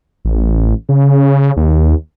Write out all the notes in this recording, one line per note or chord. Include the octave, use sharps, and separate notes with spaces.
A1
C#3
D#2